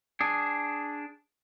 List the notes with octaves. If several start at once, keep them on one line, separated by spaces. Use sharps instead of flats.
D4 G#4